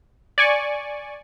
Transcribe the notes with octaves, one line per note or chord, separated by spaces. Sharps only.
D5 G#5 C#6